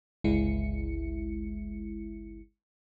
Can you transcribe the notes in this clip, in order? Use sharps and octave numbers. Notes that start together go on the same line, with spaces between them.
G1 C#2 G#3 E4 C#7